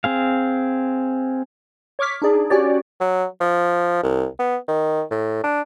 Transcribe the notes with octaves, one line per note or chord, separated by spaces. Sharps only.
C4 G#4 F5
C#5 C#6 D6 F6 B6
D4 D#4 G#4 D5
C#4 F#4 G4 C#5 D5
F#3
F3
C2
B3
D#3
A2
D4